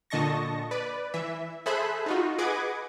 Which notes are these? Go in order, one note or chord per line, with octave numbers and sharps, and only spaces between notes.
A#2 D3 D#5 A5 C#6 A#6
B4 D5
E3 E5
G#4 A4 C5 E5 B5 F#6
D#4 F4 F#4
G#4 B4 D#5 F#5 D6 G#6